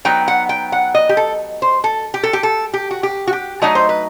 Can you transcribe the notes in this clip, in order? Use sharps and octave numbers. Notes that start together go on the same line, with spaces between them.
F#3 B3 D#4 G5
F#5
G5
F#5
D#5
G4
A4
C5
A4
G4
A4
G4
A4
G4
F#4
G4
F#4
G4
F#3 A3 D#4 D#5
C5
B4